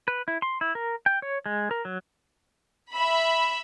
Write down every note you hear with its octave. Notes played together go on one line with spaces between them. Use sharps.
B4
E4
C6
E4
A#4
G5
C#5
G#3
A#4
F#3
E5 B5